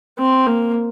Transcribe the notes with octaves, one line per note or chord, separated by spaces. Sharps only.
C4
A#3